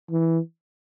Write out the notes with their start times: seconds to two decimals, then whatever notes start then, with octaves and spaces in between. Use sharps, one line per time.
0.11 E3